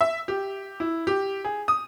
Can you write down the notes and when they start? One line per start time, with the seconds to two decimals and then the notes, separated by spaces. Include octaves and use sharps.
0.01 E5
0.28 G4
0.80 E4
1.07 G4
1.45 G#4
1.68 D#6